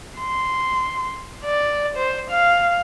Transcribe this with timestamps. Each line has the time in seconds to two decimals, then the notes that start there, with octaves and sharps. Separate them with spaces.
0.19 C6
1.45 D5
1.97 C5
2.31 F5